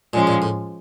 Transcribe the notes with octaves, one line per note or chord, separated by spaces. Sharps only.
A#2 F3 G#3 C#4
A#2
A2